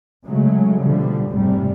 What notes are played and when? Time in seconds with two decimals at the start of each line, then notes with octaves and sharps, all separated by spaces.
0.25 C#3 F#3 G#3 A3
0.81 B2 D3 F3 G3
1.30 F1 G#2 C3 G3